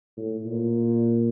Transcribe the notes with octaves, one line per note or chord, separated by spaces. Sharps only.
A2
A#2